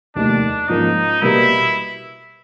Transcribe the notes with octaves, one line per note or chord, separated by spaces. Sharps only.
F1 D#2 D#3 D4
G#2 F3 A#3 C#4 D#4
B2 G3 A#3 E4